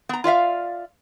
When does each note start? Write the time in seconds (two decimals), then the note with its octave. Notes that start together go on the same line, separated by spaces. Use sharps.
0.09 B3 A#5
0.24 F4 D5 E5 F5